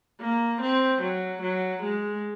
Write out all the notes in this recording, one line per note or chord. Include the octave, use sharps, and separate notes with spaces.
A#3
C4
F#3
F#3
G#3